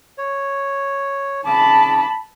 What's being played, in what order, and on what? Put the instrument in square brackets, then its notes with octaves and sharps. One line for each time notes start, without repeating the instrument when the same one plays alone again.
[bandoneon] C#5
[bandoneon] C#3 D6 [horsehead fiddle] A5 B5